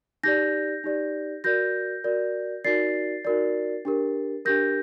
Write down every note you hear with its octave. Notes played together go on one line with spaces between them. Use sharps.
D#4 G4 D5 G6 A#6
D#4 G4 D5
F#4 A#4 D5 G6 A#6
F#4 A#4 D5
D#4 F#4 A#4 D5 A6 C7
D#4 F#4 A#4 D5
D4 G4 A#4
D4 G4 A#4 G6 A#6